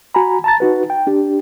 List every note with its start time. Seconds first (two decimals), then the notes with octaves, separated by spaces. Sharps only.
0.15 F#4 G#5 A#5 B5
0.44 A5 A#5 A6
0.60 D#4 F#4 B4
0.90 G5
1.07 D4 G4